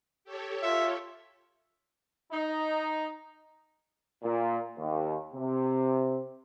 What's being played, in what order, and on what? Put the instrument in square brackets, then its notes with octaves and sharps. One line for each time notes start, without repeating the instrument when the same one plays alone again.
[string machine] G4 A4 C#5
[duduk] F4 [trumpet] E5
[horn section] D#4
[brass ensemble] A#2
D#2
C3